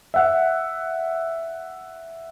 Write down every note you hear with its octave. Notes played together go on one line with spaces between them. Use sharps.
E5 F#5